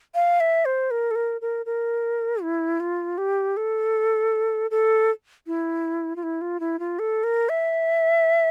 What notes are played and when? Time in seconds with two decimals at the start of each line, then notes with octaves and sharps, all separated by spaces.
0.15 F5
0.40 E5
0.65 C5
0.91 A#4
1.11 A4
1.15 A#4
1.41 A#4
1.66 A#4
2.43 E4
2.80 F4
3.18 G4
3.57 A4
4.71 A4
5.47 E4
6.16 F4
6.23 E4
6.41 F4
6.60 E4
6.79 F4
6.99 A4
7.24 A#4
7.49 E5